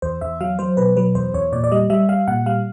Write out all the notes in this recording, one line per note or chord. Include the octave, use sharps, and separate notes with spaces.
E2 C5
E2 E5
F#3 F5
F#3 C5
B2 B4
F#3 B4
E2 C5
E2 C#5
A#2 D5
D5
G3 D#5
G3 E5
G3 F5
A#2 F#5
G3 F5